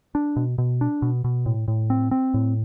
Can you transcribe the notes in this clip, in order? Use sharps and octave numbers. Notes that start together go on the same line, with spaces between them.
D4
B2
B2
D4
B2
B2
A2
A2
C4
C4
A2